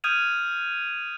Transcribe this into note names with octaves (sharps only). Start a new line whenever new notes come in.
D#6 F6 G6 G#6 D#7 F7